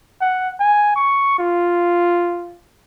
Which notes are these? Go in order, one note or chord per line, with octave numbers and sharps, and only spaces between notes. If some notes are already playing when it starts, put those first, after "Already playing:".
F#5
G#5
C#6
F4